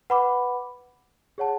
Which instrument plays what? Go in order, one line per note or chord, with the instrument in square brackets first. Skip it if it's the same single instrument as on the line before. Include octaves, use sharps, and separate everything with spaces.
[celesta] B4 F#5 B5 D6
G#4 C#5 F#5 A5